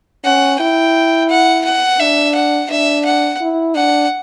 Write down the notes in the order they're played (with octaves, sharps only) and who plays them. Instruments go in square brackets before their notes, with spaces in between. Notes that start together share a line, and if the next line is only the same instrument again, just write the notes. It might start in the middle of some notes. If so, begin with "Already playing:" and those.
[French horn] C#4 [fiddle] F#5
[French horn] E4 [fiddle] G5
[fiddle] F#5
F#5
[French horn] D4 [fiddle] E5
[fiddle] F#5
[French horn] D4 [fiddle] E5
[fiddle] F#5
[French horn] E4
[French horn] D4 [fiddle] F#5